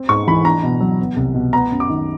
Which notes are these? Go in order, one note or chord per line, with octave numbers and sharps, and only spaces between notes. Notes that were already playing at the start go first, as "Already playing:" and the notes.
Already playing: C4
G#2 C#6
E3 B5
D4 A#5
B2
F#3
B3
C2
B2
B3 A#5
F#2
D6
D#3